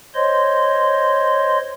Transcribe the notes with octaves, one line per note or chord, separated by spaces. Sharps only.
C5 C#5 D#5 C6